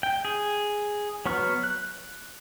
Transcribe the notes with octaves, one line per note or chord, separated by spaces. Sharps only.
G5
G#4
F#3 B3 C#6 F6
F#6